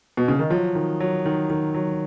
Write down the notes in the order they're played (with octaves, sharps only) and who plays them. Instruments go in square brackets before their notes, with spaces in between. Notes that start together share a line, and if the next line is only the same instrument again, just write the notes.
[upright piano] B2
C#3
D#3
[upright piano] F3 [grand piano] F#3
[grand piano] D#3
F#3
D#3
D#3
F#3